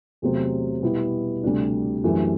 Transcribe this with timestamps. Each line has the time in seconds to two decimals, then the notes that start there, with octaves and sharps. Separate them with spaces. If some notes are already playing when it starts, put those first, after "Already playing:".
0.22 E2 C3 F#3 A3 C4
0.82 B2 G3 B3 E4
1.43 D2 C3 G3 D4
2.04 F#2 E3 A3 D4 G4